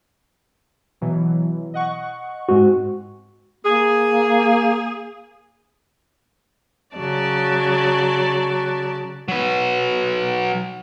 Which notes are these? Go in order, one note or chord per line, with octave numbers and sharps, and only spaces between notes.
B2 E3 F#3
D#5 F#5 C#6
G#2 G#3 C4 F#4
A#3 G#4
C#3 F#3 D5 A5
F#3 B4